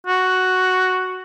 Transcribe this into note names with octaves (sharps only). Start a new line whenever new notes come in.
F#4